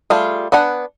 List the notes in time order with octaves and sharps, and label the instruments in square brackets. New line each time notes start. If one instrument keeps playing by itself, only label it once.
[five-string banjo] G3 A3 F4 G#4
B3 D4 F#5 G#5